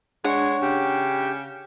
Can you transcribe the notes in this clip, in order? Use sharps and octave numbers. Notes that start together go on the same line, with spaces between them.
G#3 D4 C#5 F#5
C#3 G4